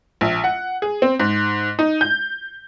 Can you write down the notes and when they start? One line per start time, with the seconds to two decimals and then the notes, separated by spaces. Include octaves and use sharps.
0.21 A#1
0.44 F#5
0.82 G#4
1.02 C4
1.20 G#2
1.79 D#4
2.01 G6